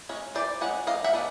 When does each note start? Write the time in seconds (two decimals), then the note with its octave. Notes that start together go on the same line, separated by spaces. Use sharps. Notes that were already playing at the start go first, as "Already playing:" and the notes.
0.09 G#3 C#4
0.35 E3 C5 D5
0.61 G#3 C#4 F#5
0.87 F3 D#5 F5
1.04 E5 F#5
1.13 G#3 B3 D4